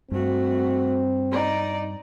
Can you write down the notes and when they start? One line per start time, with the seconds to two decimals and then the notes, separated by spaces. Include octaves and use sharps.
0.11 G2 A3 C4 F#4
1.31 D#4 D5